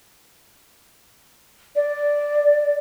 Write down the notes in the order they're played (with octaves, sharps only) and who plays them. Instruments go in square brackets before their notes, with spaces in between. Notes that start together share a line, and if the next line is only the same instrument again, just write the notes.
[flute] D5